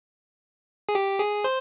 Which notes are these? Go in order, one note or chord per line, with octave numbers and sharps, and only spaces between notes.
G#4
G4
G#4
C5